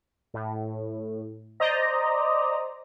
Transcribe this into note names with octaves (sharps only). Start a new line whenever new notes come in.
A2
C5 D5 D#5 A#5